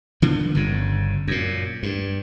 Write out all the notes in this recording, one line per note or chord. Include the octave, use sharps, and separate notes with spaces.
D3 D#3 F3 B3
G1 G2 C#3
F#2 A#2
G2